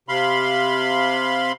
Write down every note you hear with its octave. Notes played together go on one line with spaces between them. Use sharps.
C3 F5 B5 C6